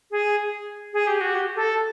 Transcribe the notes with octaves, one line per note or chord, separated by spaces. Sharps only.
G#4
G#4
G4
F#4
G4
A4